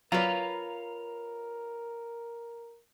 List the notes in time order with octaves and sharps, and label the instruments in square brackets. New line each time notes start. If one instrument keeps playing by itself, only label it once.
[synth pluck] F#3 D5 [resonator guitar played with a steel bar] F4 B4 [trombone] A#4 [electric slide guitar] C#5 F5 A#5